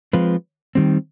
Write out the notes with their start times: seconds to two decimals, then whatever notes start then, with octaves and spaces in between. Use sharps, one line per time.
0.13 F3 G#3 C4 F4 B4
0.75 D#3 G3 C4